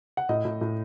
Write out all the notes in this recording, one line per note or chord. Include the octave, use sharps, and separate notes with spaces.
F#5
A2 D#5
A2
A2